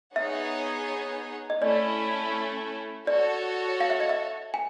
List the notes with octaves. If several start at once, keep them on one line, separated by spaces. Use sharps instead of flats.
B3 D#4 G#4 C#5 E5 F#5
D#5
A3 C#4 E4 D5
F#4 A4 C#5 D5
F5
E5
D#5
E5
G#5